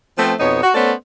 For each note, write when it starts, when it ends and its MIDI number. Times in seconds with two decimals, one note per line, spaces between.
0.18 0.33 53
0.18 0.33 57
0.18 0.33 59
0.18 0.33 60
0.40 0.59 41
0.40 0.59 47
0.40 0.59 59
0.40 0.59 63
0.40 0.59 73
0.63 0.70 66
0.74 0.92 57
0.74 0.92 59
0.74 0.92 61
0.74 0.92 69
0.74 0.92 72
0.74 0.92 74